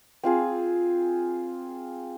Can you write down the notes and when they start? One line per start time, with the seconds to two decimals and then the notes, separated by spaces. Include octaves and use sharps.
0.23 C4 F4 G#4